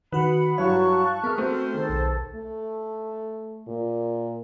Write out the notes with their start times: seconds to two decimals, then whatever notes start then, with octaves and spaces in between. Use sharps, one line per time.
0.12 D#3 F#4 B4 F#5 B5
0.58 G2 F#3 E4 C#5 F5 A5 C#6 F#6
1.24 B3 G#4 A#4 E5 F6
1.38 A3 C4 F#4 C5
1.73 D#3 G#4 A4
1.89 B1
2.35 A3
3.68 A#2